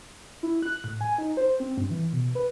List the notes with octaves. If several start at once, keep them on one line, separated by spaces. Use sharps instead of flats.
E4
F#6
A2
G#5
D#4
C5
C4
G2
E3
B2
B4